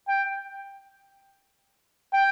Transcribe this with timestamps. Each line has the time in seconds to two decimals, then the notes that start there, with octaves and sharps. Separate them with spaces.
0.08 G5
2.13 G5